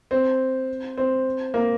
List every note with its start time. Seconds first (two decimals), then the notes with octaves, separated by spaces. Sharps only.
0.11 C4
0.97 C4
1.54 A#3